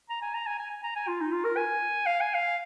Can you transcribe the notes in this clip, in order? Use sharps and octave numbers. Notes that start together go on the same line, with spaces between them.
A#5
G#5
A#5
G#5
G#5
G#5
A#5
G#5
F4
D#4
F4
A#4
G#5
F5
G#5
F5